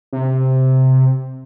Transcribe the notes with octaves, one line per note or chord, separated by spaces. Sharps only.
C3